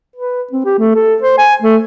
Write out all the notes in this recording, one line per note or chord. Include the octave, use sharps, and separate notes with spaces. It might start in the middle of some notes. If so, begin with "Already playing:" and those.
B4
C4
G4
A3
A4
C5
G#5
A3